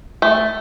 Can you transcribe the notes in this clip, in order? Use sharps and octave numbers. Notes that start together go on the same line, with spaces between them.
A3